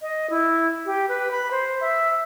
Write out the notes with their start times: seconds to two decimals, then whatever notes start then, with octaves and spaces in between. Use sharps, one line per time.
0.02 D#5
0.30 E4
0.86 G4
1.09 B4
1.31 B5
1.51 C5
1.81 E5